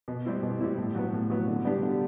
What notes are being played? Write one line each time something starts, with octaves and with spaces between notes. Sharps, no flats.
B2
G3 C4 E4
B2
G3 C4 E4
A2
F#3 B3
A2
F#3 B3
D3
G3 B3 D4 G4
D3